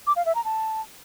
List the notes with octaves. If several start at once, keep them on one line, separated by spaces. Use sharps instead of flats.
D6
F5
E5
A#5
A5